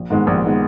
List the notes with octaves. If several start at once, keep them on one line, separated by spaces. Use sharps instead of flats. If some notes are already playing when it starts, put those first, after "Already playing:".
Already playing: A#1
G#2 D#3 G#3 B3
A#1
D#3 G#3 B3